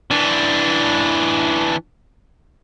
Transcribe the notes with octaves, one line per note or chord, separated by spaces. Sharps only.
E3 D4